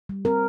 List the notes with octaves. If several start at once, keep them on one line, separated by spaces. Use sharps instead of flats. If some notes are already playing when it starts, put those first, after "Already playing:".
G3
C4 A#4